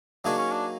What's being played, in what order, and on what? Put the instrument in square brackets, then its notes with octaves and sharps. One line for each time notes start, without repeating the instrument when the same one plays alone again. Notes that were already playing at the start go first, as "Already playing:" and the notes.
[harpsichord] F#3 A#3 D#4 G#4 C#5 [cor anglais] D4
[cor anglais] C#4
D4